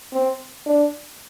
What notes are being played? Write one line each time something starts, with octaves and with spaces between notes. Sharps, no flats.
C4
D4